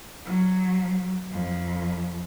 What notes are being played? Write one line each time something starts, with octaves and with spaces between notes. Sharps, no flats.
F#3
F2